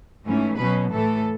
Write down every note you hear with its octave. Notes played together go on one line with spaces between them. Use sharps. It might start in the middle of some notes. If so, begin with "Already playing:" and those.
G#2 E3 A3 C#4
B2 F#3 C#4 B4
A2 E3 A3 A4